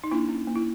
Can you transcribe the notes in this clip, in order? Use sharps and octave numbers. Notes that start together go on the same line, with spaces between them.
D#4
A#3 D4 E4
C#4
A#3
E4